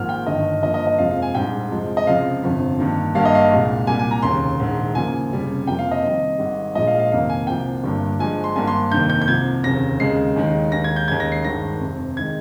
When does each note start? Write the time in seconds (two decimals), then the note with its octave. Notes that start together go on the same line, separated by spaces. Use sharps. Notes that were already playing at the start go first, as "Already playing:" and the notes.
Already playing: G#1 G#2 F3 A#3 F6
0.09 G5
0.26 G1 G2 D#3 D#5
0.63 G2 F3 A#3 D#5
0.74 D#5
0.87 D#5
0.98 F1 F2 C3 F3 G#3 F5
1.11 F5
1.22 G#5
1.35 A#1 G#2 G3 G5
1.71 F2 C3 F3 G#3
1.97 D#5
2.07 C#2 C3 F3 G#3 F5
2.43 G1 F2 C3 F3
2.79 G2 D#3 A#3
3.15 G#1 G2 G3 A#3 F5
3.25 D#5
3.35 F5
3.51 C2 A#2 G#3
3.87 C2 A#2 G3 G#5
3.99 G#5
4.11 A#5
4.22 F1 D#2 C#3 C6
4.60 A#1 G#2 D#3
4.95 C#2 C#3 F3 A#3 G#5
5.31 F1 F2 C#3 G3
5.67 F1 F2 C3 F3 A#3 G5
5.79 F5
5.91 D#5
6.03 F2 C3 D#3 G3
6.39 G#1 G#2 G3
6.75 A#1 A#2 F3 G#3 D#5
6.87 F5
7.00 F5
7.12 F1 F2 D#3 A#3 F5
7.29 G#5
7.47 C2 C3 F3 A#3 G5
7.83 G1 G2 G3 A#3
8.20 G2 F3 G#3 G#5
8.44 C6
8.56 G#1 G2 G3 A#3 G#5
8.67 C6
8.92 F1 F2 D#3 A#3 G6
9.10 G6
9.22 G6
9.27 C2 C3 F3 G#6
9.64 F1 D#2 C#3 A#6
10.00 D#2 C#3 G#3 C7
10.36 D#2 D#3 G#3
10.72 D#2 D#3 G#3 A#6
10.84 G#6
10.96 G6
11.08 D#2 C#3 G#3 G#6
11.20 A#6
11.32 C7
11.44 G#1 G2 D#3 G#3 A#6
11.80 F1 F2 C3
12.17 D#3 G#3 G#6